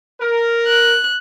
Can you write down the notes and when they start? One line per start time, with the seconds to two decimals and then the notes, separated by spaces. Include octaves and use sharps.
0.21 A#4
0.67 F#6